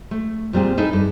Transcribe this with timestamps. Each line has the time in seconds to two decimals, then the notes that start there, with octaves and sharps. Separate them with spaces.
0.11 A3
0.53 A#2 G3 C4 G#4
0.78 D#4 E4 G#4 A4
0.93 G2